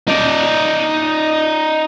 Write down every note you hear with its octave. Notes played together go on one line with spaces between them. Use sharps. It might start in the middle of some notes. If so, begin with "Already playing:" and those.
D#4 D5